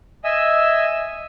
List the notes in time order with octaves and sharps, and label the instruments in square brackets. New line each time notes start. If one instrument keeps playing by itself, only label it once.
[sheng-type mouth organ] D#5 E5 G#5 E6